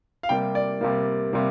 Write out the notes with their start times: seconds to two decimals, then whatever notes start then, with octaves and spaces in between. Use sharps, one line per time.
0.23 F5
0.29 C3 G3 A#3 G5
0.55 D5
0.81 C3 G3 A#3
1.33 C3 G3 A#3